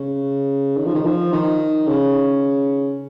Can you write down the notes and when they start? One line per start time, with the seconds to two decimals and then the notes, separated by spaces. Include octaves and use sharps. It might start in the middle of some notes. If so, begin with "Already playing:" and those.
Already playing: C#3
0.77 D#3
0.85 F3
0.94 D#3
1.05 F3
1.32 D#3
1.88 C#3